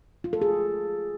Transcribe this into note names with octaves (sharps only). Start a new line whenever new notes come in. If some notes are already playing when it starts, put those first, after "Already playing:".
F4
A4
G#4